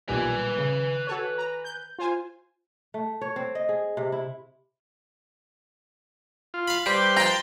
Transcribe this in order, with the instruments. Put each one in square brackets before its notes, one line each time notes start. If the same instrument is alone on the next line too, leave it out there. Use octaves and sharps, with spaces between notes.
[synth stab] B1 A#2 G3 [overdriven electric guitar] B4 G#5
[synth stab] C#3
F#4 A4 C#5
A#5
G6
F4 C5 G#5
[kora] A3
C#5
C4
D#5
G#4
C3
E4
[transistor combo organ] F4
[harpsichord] F5 B5
[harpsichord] G3 [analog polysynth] G4 G5 [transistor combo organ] B4 C5
[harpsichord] F3 F4 [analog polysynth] G5 G6 A6 [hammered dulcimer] A#5